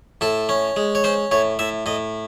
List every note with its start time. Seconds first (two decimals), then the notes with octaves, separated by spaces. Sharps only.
0.21 A2 A4
0.49 C#4
0.77 G#3
0.95 C#5
1.04 C#4 C5
1.31 A2 C#5
1.59 A2 E5
1.86 A2 D#5